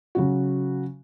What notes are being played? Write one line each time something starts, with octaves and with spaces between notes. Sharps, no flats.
C#3 F#3 F#4